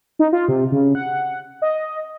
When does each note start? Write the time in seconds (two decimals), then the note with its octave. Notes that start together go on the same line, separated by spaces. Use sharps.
0.19 D#4
0.33 F4
0.48 C3
0.72 C#3
0.95 F#5
1.62 D#5